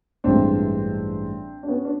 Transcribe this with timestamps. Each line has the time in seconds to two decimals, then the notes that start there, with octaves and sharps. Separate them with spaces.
0.24 A1 G2 E3 G#3 C4 D4
1.63 D4
1.68 B3 C#4
1.85 D4